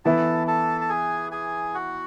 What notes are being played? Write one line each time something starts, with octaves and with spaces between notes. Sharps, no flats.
E3 B3 E4 A4 A5
A4 A5
A5
G#4 G#5
G#4 G#5
F#4 F#5